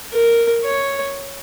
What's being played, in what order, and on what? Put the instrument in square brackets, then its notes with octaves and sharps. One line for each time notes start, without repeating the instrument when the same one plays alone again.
[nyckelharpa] A#4
C#5